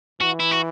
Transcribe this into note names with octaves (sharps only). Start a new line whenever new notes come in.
E3 F#4
E4
F#4